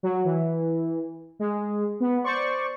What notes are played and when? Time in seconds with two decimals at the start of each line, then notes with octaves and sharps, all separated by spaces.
0.03 F#3
0.25 E3
1.39 G#3
2.00 B3
2.24 C5 D5 C#6